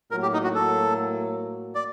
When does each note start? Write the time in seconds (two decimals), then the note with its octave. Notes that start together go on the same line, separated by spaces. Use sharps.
0.11 A2 F#3 A#3 A#4
0.22 G4
0.33 D#4
0.44 F#4
0.55 A4
1.75 D5